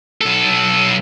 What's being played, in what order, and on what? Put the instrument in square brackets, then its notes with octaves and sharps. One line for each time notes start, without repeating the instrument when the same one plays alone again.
[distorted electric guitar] B1 A4